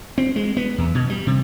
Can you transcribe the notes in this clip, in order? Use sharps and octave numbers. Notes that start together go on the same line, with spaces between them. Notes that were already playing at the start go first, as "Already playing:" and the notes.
C4
G#3
B3
E2
B2
G3
C3